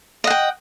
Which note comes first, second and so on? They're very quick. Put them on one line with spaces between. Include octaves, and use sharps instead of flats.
D#5 F#5 G5